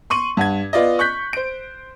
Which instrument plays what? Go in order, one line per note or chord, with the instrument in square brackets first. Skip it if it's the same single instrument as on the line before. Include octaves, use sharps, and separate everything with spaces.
[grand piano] C6 C#6 D#7 F#7
G2 F#5 G#6
B3 F4 D5 D#5
C#6 F#6 G6 B6
C5 D7